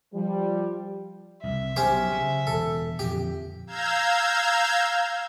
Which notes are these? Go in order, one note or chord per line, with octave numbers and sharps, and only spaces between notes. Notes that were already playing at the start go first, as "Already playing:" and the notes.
F3 G3
C2 E5
B1 C#4 G4 C5
C#3
E1 A4
F2 A#2 D3 G4
F5 A#5 E6 G6 G#6